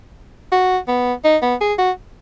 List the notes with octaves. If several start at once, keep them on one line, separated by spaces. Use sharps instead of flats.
F#4
B3
D#4
B3
G#4
F#4